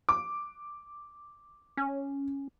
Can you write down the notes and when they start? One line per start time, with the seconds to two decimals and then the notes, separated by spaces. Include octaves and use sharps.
0.09 D6
1.77 C#4